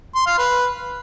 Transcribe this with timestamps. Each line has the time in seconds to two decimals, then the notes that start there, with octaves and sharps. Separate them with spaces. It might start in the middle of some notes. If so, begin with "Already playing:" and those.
0.15 C6
0.27 F5
0.38 B4